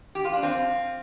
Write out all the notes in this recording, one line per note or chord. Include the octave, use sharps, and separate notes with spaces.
G4
F4
D4
C4 F4